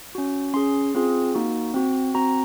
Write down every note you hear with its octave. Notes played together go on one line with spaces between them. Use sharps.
C#4 F#4
C#4 G#4 C6
C4 F4 G#4
A#3 D#4 F#4
C4 F#4
C4 F#4 A#5